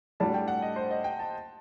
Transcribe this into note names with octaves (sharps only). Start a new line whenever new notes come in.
A2 G3 D4 F#4 A5
G5
F#5
D#5
C5
D#5
G5
A5